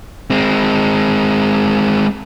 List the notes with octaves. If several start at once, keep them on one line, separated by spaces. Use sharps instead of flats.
G#3 C4